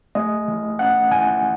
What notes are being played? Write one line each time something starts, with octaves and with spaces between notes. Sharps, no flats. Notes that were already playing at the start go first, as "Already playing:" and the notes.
A3 D#5
E3
C#4 F#5
E3 G#5